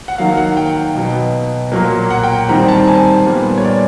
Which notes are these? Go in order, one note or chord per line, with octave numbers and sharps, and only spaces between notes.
F#5
D#3 F#3 A#3 F5
F#5
G5
B2 F#3 B3
A#2 F#3 A#3
F#5
G5
D#3 G3 C4 A#5
A5
G#5
A#2 G3 B3
C#5
D5